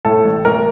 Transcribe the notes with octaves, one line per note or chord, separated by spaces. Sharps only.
A2 A4
A1
A1 A#4